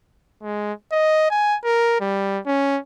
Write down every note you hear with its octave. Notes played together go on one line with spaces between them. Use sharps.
G#3
D#5
G#5
A#4
G3
C#4